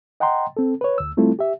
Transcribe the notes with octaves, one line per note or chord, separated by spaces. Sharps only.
D#5 F#5 G5 A#5 C6
C4 A4
B4 C#5
D2 E6
G3 A3 C4 E4 F4 A4
G4 E5